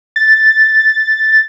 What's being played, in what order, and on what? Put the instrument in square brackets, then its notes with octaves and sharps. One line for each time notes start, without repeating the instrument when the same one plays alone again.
[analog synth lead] A6